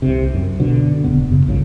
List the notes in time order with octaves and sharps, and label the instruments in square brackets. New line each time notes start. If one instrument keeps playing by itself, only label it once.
[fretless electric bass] C2 C3
F#2
B2 D3
D#1 C#3 B3
F#2 C#3
G#1 C#2 F#2 C#3